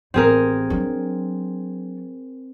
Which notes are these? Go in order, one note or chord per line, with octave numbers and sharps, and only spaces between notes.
A1 C4 G#4 A#4
F#3 D4